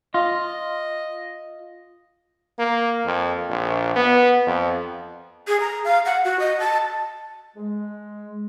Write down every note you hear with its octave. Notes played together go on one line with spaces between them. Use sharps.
F4 D#5
A#3
F2
A#1
B3
F2
G#4
A#5
F5
F#5
F#4
D#5
A5
G#3